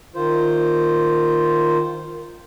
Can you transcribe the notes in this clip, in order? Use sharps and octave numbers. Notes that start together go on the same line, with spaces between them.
D#3 F4 C5